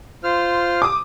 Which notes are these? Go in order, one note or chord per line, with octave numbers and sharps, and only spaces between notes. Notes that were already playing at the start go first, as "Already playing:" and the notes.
F4 C5 F6
D6 D#6